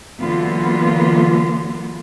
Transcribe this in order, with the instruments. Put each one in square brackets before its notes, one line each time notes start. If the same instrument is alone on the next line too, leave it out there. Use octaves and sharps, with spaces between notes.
[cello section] D3 E3 F#3 A#3 B3 F4